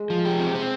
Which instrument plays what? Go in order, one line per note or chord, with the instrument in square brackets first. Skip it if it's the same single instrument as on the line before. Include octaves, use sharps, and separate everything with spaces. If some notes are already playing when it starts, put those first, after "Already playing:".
Already playing: [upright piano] G#3
[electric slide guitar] F3
G4
C4
C4